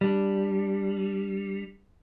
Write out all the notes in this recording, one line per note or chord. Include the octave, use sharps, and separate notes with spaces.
G3 D4